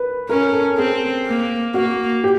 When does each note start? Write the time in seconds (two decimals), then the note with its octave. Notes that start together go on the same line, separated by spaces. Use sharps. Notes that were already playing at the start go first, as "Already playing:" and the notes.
Already playing: A#4 B4
0.29 C#4 A#4
0.53 A4
0.78 C4 G#4
1.26 A#3
1.74 A#3 F#4
2.24 G4